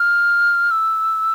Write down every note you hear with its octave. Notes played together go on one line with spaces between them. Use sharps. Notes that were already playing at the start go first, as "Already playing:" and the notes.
Already playing: F6
E6